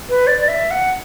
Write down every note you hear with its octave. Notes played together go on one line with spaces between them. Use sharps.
B4
D5
D5
E5
F#5